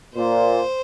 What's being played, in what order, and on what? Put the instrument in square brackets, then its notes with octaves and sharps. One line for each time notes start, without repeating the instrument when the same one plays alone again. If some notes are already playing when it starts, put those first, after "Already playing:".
[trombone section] A#2 [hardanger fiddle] C5